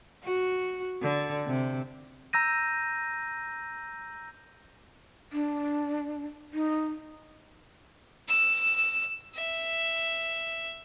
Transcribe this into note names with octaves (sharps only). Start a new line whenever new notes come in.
F#4
D3
C3
A#5 E6 G6 A#6 D#7
D4
D#4
E6
E5